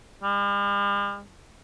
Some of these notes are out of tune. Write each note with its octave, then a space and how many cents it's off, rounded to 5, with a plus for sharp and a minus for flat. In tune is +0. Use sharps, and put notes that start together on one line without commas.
G3 +45